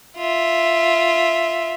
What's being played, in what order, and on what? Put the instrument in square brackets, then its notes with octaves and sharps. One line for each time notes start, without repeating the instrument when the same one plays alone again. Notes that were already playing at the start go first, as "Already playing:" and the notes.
[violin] F4 E5